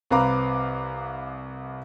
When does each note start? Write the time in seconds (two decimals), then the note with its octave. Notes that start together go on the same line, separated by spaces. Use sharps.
0.11 C2 C4 B4 F5 A#5 D6